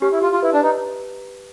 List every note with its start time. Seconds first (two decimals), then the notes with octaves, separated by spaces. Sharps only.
0.01 C#4 G4
0.12 E4
0.22 F4 G4
0.32 F4
0.43 E4 B4
0.53 D4
0.63 D#4 B4